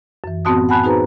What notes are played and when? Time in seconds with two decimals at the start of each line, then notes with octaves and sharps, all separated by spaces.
0.24 F#2 E3
0.45 A2 B3 C4 F#4 A5 D#6
0.69 F#5 G#5 A5 B5 F#6
0.83 D#4 F#4 G#4 B4 C5 A#5